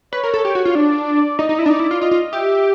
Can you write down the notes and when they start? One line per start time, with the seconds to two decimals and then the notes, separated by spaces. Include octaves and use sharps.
0.13 B4 C#5
0.23 A#4
0.34 A4
0.45 G4
0.55 F#4
0.65 F4
0.75 D4 D5
1.39 D#4 D#5
1.49 D#4
1.59 E4
1.66 D4
1.69 D#4 D5
1.80 E4
1.91 F4
2.01 F4 D#5
2.11 F4
2.33 G4 E5